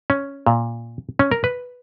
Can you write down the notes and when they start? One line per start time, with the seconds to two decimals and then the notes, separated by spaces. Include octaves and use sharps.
0.10 C#4
0.46 A#2
1.19 C#4
1.32 A#4
1.44 B4